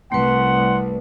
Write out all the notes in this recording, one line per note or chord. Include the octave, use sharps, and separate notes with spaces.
C2 A3 B4 F#5 C6